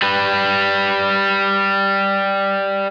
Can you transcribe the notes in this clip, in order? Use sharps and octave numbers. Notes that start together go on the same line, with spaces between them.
G3 B4